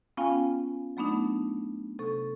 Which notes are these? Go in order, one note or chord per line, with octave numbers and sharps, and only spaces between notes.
B3 C#4 F4 F5 G5 G#5
F#3 A3 B3 D4 D#4
C3 A4 C#6